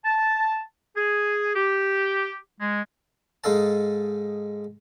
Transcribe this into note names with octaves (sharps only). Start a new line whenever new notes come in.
A5
G#4
G4
G#3
G#2 G#3 D#4 A4 F5 A5